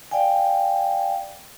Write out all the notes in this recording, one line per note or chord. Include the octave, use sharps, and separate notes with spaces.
D5 F5 G5 G#5